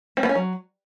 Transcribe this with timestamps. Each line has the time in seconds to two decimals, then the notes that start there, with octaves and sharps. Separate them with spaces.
0.17 C4
0.23 B3
0.29 C#4
0.35 F#3